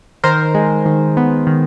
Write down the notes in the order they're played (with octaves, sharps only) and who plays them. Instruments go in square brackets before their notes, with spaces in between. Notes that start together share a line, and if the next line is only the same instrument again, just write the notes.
[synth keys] D#3 A#4 C5
G#3
D#3
B3
D#3